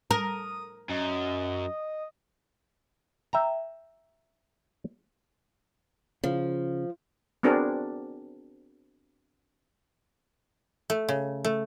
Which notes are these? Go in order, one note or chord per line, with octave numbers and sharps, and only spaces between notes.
A#4 D#6
F#2 D#5
E5 G5 A#5
C#3 F3
B3 C4 D4 F#4 G#4 A#4
A3
C#3
A3